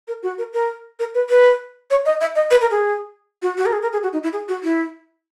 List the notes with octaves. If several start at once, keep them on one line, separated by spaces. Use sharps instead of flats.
A#4
F#4
A#4
A#4
A#4
B4
B4
C#5
D#5
E5
D#5
B4
A#4
G#4
F#4
F#4
A#4
G#4
A#4
G#4
F#4
D#4
E4
G#4
F#4
E4